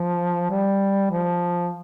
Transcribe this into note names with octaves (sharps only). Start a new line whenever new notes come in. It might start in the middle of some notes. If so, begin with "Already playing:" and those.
Already playing: F3
G3
F3